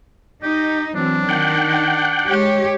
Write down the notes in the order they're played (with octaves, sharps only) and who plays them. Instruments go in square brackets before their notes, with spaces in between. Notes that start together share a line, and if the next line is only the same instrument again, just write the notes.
[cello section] D#4 [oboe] G4
[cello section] E3 F#3 C4 [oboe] D4
[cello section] D#3 [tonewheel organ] F#5 G5
[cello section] G#3 G4 C#5